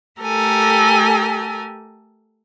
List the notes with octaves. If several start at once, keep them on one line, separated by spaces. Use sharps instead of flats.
A3 G4 A4 A#4 G#5